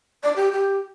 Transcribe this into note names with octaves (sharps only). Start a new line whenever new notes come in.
D5
G4
G4